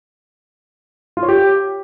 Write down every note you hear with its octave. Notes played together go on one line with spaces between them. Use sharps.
F4
C#5
G4